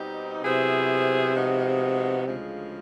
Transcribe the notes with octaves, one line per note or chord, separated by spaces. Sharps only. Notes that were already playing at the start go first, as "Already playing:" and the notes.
Already playing: B2 G3 C4 D#4 G4
C3 F#3 B3 E4 G#4 C5
F3 G#3 B3 D#4 F#4
D2 C#3 F3 G#3